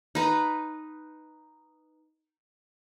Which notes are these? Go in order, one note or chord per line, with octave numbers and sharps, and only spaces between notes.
D#4 B4